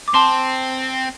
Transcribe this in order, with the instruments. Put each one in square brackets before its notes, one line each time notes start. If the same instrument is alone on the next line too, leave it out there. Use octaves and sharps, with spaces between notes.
[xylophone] D6
[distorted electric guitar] C4 [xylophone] A5 C6